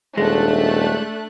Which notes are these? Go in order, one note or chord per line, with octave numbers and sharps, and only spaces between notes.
D#1 G#3 A3 D4 F#6